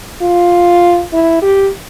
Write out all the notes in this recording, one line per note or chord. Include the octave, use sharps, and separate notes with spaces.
F4
E4
G4